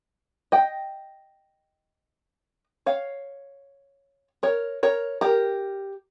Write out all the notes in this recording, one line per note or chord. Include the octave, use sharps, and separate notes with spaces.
D#5 G5
C#5 F5
A#4 C#5
A#4 C#5
G4 A#4